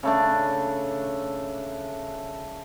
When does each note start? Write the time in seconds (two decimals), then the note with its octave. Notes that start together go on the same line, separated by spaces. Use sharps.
0.03 C#3 A3 D4